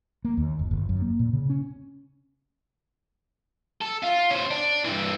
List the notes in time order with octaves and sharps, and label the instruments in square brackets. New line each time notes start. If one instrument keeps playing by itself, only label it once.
[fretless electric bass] A#3
D#2
F#1
G1
F#2
A#3
A#2
C#3
C#4
[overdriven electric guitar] A4
F4
C#4 C5
D4
G2 E3